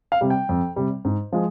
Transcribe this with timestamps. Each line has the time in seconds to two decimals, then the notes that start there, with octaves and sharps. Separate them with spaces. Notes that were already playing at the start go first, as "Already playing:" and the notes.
0.12 F5
0.21 C3 G3
0.30 G5
0.49 F2
0.76 C3 G3
1.05 G#2
1.33 F3 G#3